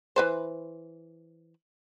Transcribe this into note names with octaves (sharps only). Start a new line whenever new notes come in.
E3 B4 C5